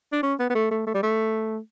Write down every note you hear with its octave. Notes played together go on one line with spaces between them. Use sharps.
D4
C#4
B3
B3
A3
A3
A3
G3
A3